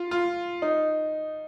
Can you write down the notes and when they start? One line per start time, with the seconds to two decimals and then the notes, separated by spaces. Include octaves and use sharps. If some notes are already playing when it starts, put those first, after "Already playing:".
Already playing: F4
0.11 F4
0.62 D#4